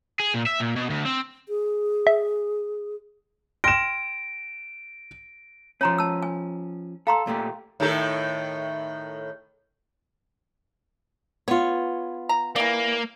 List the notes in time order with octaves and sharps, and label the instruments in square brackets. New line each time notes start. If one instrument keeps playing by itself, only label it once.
[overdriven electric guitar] G#4
A#2
E5
A#2
B2
D2
C4
[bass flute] G#4
[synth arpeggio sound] E5
[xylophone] G5 C6 F6 [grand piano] A#6 E7 [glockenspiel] D7
[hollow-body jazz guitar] F3 C#4 [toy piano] C#5 A#5 C6
[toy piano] A5 E6
G#5
[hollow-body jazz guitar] A4 [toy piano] F5 A#5 C6
[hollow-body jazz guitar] A#2 A3 G4
[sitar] A2 D#3 A4
[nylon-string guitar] B3 F4 [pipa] C#5
[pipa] A#5
[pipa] E3 D5 [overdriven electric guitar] A#3